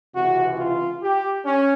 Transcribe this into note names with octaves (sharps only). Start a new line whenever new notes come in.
C#2 C3 E3 F#4
F4
G4
C#4